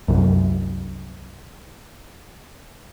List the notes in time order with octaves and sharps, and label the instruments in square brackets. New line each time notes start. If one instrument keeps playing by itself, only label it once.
[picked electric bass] C2 F#2